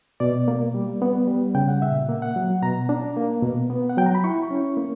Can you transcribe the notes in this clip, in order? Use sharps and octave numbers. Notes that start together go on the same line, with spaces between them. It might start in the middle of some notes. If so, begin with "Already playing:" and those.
B2 D5
A#3
G3
B3
G3
C#3 G5
F#5
A#2 E5
A#3
F#5
F#3
B2 A#5
D4
A#3
B2
B3
F#5
F#3 G5
A#5
B5
E4 C#6
C#4
A#3